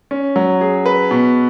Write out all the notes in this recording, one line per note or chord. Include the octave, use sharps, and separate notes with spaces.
C#4
F#3
G#4
B4
B2